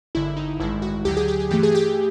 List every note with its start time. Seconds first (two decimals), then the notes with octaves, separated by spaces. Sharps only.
0.15 G#1 G2 D3 E4
0.37 D#4
0.59 A1 G2 D#3 G#3 E4
0.82 F#4
1.04 D2 D3 F#3 G4
1.17 G#4
1.28 G4
1.40 G#4
1.50 G2 E3 A3 G4
1.63 G#4
1.75 G4